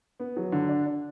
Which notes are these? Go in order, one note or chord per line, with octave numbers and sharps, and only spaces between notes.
B3
F#3
D3
D4
D4